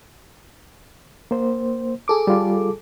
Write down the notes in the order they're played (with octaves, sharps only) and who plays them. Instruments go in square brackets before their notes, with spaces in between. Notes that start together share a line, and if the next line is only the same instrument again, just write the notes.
[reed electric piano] A#3 C5
[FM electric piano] G#4 A4 D6
[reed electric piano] G3 F4